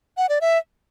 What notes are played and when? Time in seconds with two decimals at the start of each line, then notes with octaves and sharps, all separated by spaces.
0.17 F#5
0.29 D5
0.41 E5